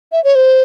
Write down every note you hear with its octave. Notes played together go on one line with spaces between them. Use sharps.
E5
C#5
C5